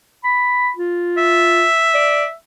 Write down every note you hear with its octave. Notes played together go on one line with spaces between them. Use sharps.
B5
F4
E5
D5